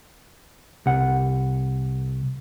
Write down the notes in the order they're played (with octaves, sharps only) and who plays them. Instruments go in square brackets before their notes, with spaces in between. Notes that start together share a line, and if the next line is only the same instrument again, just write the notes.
[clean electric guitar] C2 F#5